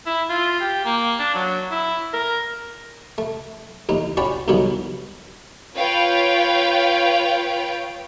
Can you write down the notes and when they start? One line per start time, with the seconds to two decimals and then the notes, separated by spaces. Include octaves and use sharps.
0.06 E4
0.29 F4
0.60 G4
0.85 A#3
1.19 D4
1.34 F#3
1.71 E4
2.13 A#4
3.18 A3
3.89 A1 D#2 D#4
4.17 C#4 F#4 D5 G5 B5
4.48 C2 B2 D3 D#3 F#3
5.76 F4 B4 C#5 F5 G5